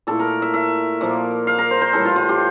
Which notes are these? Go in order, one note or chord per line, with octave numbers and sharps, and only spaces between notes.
A#2 A3 E4 A4
A#4
E5
E5
A#2 F3 A#3
F5
A#4
C5
C5
A2 E3 G3 A4
F4
F4
G4